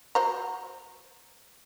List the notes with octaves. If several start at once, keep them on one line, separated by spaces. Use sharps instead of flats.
F#4 C5 A#5